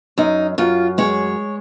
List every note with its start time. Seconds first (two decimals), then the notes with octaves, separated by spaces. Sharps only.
0.18 F#2 D#4
0.58 F#2 F4
0.98 G#3 C#5